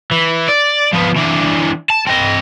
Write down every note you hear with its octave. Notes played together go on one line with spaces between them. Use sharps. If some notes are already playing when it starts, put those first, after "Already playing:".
E3
D5
F3 B3
E3 D4
A5
C4 D#5